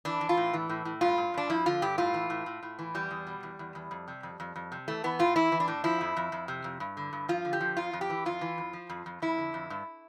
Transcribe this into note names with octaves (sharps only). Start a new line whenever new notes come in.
E3 D4
E3
F4
A2
E3
A2
A2
G2 F4
G2
G2 D4
F3 E4
D3 F4
G2 G4
A2 F4
E3
A2
A2
A2
E3
E2 G3
E2
B2
E2
E2
E2
F2
C3
F2
F2
F2
C3
E3 A3
E3 B3
A2 F4
E3 E4
E3
D4
A2
F3 E4
F2
F2
F2
C3
F2
G2
D3
G2
F3 F4
D3
G4
F3
F2 F4
F2
G4
E3
F2 F4
E3
F2
F3
F2
F2
F2 E4
D3
F2
G2